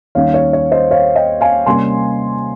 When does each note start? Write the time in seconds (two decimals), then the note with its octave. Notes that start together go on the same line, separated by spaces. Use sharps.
0.15 D#2 D#3 G3 C#4 C#5 F5
0.34 C#5
0.53 C#5
0.72 C5 D#5
0.91 C#5 F5
1.16 D#5 G5
1.41 F5 G#5
1.66 C3 G3 A#3 C#4 G#5 C6